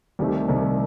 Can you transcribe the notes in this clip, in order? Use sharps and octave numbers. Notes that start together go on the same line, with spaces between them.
C2 C3 D#3 A3 G4
C2 C3 D#3 A3